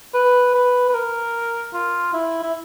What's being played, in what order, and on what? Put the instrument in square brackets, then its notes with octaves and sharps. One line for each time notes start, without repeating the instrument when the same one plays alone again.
[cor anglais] B4
B4
B4
A#4
F4
E4
E4